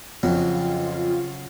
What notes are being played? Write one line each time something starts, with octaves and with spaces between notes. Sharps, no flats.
F2 C#3 F#3 F4